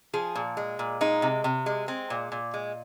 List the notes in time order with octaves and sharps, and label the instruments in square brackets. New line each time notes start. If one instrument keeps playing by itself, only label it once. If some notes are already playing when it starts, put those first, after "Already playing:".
[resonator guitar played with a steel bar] F3 G#4
A#2
G#3
A#2
G#3 D#4
C3
C3
G#3
G#3 C4
A#2
A#2
G#3